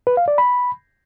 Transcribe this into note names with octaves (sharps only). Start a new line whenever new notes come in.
B4
F5
D5
B5